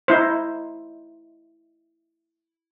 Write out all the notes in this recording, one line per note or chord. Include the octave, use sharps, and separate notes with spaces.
D#4 E4 C5